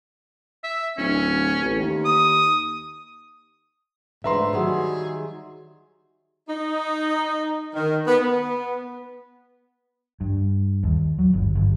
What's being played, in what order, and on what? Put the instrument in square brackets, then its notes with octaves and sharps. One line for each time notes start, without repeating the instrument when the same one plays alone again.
[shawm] E5
[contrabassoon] D1 [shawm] C#4
[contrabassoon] A1
D#2
[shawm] D#6
[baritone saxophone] G#2 [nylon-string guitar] A3 D4 B4 [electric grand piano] E5 A#5 C6
[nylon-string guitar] D#3 F#3 G3 [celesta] F#4 F#5 E6 [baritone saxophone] G#4
[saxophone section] D#4
D#3
B3
B3
[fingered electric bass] G2
D#2
F#3
G1
G1